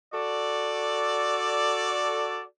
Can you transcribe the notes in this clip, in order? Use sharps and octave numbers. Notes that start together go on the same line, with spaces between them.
F#4 A4 D5